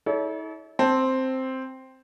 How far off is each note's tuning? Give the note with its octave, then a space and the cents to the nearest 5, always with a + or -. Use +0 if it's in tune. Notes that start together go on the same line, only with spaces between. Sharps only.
E4 -45 A4 -30 C#5 +40
C4 +0 A5 +0